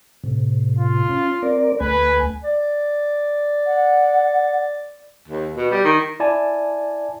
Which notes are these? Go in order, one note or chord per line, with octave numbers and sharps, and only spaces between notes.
A2 C3
F4
C#4
C4 A#4 D5
D2 A3 B4 G#5
D5
F#5
D#2
B2
G3
D#3
E4 D5 G#5 A5